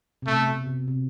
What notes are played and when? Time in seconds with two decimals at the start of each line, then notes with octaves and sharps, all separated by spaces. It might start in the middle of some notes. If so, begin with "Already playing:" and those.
0.22 C3
0.27 B2 A3
0.48 B2
0.67 C3
0.88 C3